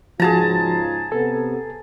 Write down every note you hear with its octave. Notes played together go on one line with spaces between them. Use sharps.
C#2 G#2 F3 F4 F#4 G#4 A5 A#5
C3 B3 A4